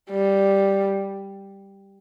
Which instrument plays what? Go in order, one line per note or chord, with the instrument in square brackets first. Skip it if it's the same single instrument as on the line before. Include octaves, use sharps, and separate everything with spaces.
[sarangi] G3